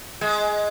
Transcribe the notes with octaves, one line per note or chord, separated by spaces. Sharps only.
G#3